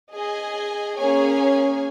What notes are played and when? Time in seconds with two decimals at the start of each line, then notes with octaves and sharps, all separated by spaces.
0.13 G#4 D#5 G#5
0.97 A#3 C#4 G#4 C#5 G#5